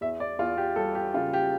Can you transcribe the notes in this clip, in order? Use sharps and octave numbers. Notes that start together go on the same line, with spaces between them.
E2 E5
D5
E2 F4
G4
G3 A4
G4
C#3 F4
G4